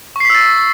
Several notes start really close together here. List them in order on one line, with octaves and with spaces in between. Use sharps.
C#6 C7 B6 E6 A6